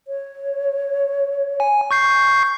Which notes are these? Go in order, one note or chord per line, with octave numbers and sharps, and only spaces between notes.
C#5
G#5
C#6 G6 C7